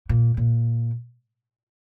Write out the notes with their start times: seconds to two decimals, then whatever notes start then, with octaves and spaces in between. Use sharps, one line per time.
0.09 A#2
0.37 A#2